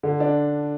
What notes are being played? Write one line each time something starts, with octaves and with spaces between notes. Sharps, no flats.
D3
D4